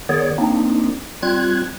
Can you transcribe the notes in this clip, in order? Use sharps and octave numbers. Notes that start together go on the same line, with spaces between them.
D#3 B3 G#4 C#5 D5
A#3 C4 D4 D#4
G3 C4 F4 F#6 G#6